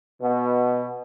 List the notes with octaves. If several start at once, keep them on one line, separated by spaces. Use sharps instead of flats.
B2